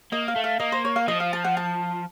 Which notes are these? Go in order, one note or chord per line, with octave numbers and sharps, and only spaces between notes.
A#3 D#5
F5
A3
F5
A#3 D#5
C5
C#5
F5
F3 D#5
F5
A5
F#5
A5